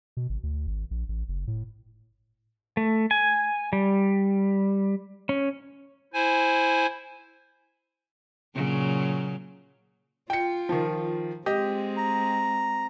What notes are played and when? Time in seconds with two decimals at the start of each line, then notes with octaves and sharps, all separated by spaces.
0.17 B2
0.29 G#1
0.43 D2
0.67 G#1
0.91 A#1
1.09 A1
1.28 F#1
1.47 A2
2.77 A3
3.11 G#5
3.73 G3
5.29 C#4
6.14 E4 C5 G#5
8.55 A#2 C#3 F#3
10.30 F4 G5 C#7
10.69 D#3 F3
11.46 G#3 C4 G4 D#5
11.97 A#5